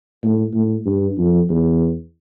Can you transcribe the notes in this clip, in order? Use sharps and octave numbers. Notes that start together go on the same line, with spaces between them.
A2
A2
G2
F2
E2